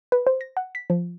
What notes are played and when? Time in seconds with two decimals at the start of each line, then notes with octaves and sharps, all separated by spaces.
0.12 B4
0.27 C5
0.41 A#6
0.57 F#5
0.75 B6
0.90 F3